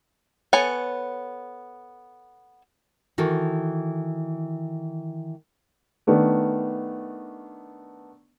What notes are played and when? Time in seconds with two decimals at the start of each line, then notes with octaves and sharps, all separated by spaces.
0.53 B3 A4 C#5 G#5
3.18 D#3 E3 F#4 A4
6.07 D#3 A3 B3 D4